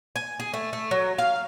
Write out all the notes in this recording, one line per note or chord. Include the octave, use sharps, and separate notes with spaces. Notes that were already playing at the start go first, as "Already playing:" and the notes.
G#5
G#4
A3
A3
F#3
F5